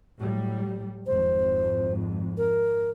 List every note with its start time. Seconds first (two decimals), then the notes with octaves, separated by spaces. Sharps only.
0.18 A2 F#3 G3
1.07 G#1 F2 C5
2.38 A#4